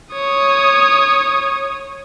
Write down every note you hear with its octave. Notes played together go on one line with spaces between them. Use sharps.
C#5 D#6